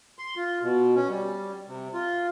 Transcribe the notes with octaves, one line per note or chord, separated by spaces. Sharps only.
C6
F4
B2
C#4
G3
C3
F4